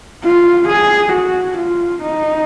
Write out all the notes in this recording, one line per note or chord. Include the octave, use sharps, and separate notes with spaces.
F4
G#4
F#4
F4
D#4